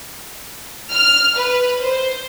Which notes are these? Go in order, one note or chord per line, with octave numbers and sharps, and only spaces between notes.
F6
B4
C5